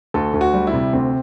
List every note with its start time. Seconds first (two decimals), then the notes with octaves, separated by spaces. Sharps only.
0.14 D2 A4
0.34 D2
0.41 F#4
0.54 G3
0.67 E4
0.73 C3
0.93 D2 C4